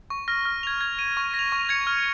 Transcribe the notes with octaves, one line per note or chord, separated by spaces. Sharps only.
C#6
F6 A#6
F6
G#6 F7
G#6
D#7
C#6
A#6
F7
C#6
G#6 C#7 F7
F6